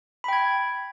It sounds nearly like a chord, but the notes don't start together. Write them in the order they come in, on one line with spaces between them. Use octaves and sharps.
B5 G5 G#6